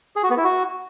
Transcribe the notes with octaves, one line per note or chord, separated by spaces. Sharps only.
G#4
F#4
B3
E4
F#4